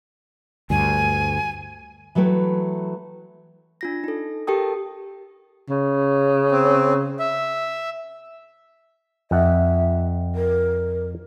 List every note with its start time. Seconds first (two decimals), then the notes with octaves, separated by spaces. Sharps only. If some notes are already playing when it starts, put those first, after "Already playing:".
0.70 D2 G2 G#5
2.15 E3 F#3 A3 B4 G5
3.81 D4 F4 A#6
4.04 D#4 A4
4.47 G4 A4 A#4 G5 A5 D#6
5.70 C#3
6.51 C4
7.19 E5
9.31 F2 E5 F#5
10.35 A#4